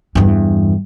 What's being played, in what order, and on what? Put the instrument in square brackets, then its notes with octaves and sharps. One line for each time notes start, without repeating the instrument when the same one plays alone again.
[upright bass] E2 G2